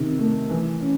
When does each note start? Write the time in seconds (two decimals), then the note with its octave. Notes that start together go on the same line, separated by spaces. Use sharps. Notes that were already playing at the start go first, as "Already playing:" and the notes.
Already playing: C3 D#3
0.19 A3
0.50 E3
0.81 C#4